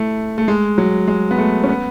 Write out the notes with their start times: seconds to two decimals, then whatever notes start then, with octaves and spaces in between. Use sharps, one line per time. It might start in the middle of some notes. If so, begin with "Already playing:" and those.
Already playing: A3 E4
0.38 A3
0.48 G#3
0.78 F#3
1.08 G#3
1.31 B3
1.38 A3
1.64 C#4
1.69 B3